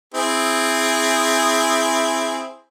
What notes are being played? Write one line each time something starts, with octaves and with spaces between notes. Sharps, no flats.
C4 E4 G#4